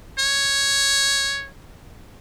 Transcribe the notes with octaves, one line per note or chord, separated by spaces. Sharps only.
C#5